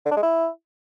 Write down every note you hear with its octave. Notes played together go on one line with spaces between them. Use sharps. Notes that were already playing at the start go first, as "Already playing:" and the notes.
D3
D4
G#3
E4